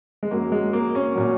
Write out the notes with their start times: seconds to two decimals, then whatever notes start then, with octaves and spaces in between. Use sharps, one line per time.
0.23 G#3
0.31 F#2 F#3 A#3
0.52 G#3
0.73 A#3
0.95 C#4
1.15 A#2 F#3